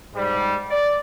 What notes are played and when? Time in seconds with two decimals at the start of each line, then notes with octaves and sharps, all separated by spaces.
0.13 G#2 G3
0.70 D5